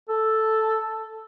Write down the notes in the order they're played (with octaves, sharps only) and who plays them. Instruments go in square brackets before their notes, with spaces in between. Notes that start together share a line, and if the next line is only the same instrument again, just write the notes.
[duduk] A4